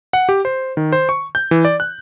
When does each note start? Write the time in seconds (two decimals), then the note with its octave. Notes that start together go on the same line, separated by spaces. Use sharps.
0.13 F#5
0.29 G4
0.45 C5
0.77 D#3
0.92 C5
1.09 C#6
1.35 G6
1.51 E3
1.65 D5
1.80 F#6